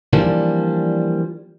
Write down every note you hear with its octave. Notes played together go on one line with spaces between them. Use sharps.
E3 F3 G3 A#3 D4